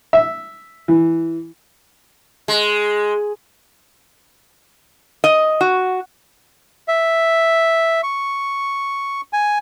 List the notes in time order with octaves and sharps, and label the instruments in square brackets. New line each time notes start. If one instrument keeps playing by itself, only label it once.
[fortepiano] E5
E3
[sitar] G#3
[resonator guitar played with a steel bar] D#5
F#4
[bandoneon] E5
C#6
G#5